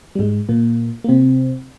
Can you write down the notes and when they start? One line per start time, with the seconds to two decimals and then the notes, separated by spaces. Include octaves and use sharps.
0.15 G3
0.19 G#2 G#3
0.49 A#2 A#3
1.04 A#3
1.08 C3 C4